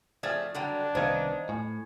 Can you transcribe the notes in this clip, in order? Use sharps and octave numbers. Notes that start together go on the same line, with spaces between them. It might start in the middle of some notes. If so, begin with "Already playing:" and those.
F3 A3 G#4 D5 G#6 A6
D3 F#3 G3 D4 F#5
C2 D#3 B3 D#4 C5 F5 G#6
A2 G#5